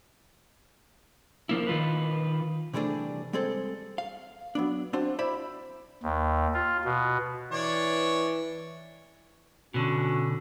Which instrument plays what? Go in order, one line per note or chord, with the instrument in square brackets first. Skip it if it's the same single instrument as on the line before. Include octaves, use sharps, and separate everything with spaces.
[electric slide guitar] F3 A#3 E4
D#3 F4 B4
[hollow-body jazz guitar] C3 E3 G3 A3 D4 G#4
G3 G#3 C4 G#4 A4
F5
F#3 B3 D4
C4 D4 F4 F#4 C5
E4 C5 D5 E5 B5
[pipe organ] D#2
F4
B2
[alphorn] E3 [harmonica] D4 C#5
[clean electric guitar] B2 D3 [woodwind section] C#4 D4 F#4